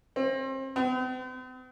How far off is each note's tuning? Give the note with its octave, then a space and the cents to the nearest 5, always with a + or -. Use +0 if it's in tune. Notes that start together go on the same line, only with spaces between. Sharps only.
C4 +35
C4 -45